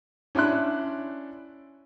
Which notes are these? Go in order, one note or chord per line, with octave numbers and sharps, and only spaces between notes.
C#4 D4 E4 C6 F#6